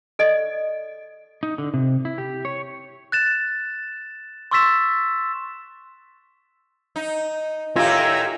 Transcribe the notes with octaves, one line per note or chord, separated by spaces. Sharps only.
A4 D5 D#5
D#4
D3
C3
E4
G4
C#5
F#6 A6 E7
C6 C#6 E6 A6 B6 E7
D#4
A2 D#3 F4 G4 E5 G#5 A#5